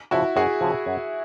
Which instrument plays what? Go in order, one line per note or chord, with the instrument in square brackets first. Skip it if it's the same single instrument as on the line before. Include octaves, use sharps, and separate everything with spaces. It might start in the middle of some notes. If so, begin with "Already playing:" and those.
[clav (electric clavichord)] C#3 F3 [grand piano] E4 F#4
[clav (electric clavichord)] F#2 [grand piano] F#4 G#4
[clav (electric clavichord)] C#3 F3
F#2